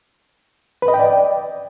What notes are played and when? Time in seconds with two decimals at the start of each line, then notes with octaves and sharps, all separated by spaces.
0.82 B4
0.88 D#5
0.94 G5
0.99 D5